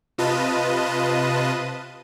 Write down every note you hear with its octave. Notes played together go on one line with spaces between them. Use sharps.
C3 F4 B4 D#5 A5 D#7